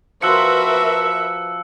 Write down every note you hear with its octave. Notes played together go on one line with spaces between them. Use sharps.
F3 F#4 A#4 B4 E5 E6 F#6 C#7